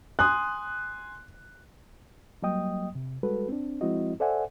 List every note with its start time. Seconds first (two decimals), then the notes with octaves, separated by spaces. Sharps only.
0.19 G#5 C6 D#6 F#6
2.42 F#3 G3 A#3 D#5 G5 D#6
2.95 C3
3.23 G3 G#3 F#4 A4 B4
3.48 C4 D4
3.81 F3 G#3 C4 E4 F#4 D#5
4.20 A4 C5 D5 E5 F#5 G#5